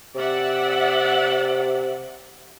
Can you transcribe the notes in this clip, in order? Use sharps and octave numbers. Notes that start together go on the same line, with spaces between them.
C3 D5 E5 F#5